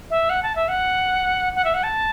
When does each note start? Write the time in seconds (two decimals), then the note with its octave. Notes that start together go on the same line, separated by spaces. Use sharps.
0.10 E5
0.30 F#5
0.43 A5
0.56 E5
0.68 F#5
1.55 F#5
1.65 E5
1.74 F#5
1.83 A5